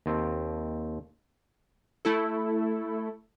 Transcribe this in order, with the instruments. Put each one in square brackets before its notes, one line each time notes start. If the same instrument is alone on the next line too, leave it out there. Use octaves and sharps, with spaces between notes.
[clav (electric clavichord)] D#2 C4
[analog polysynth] A3 E4 A4